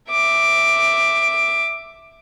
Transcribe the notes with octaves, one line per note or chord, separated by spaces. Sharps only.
E5 D6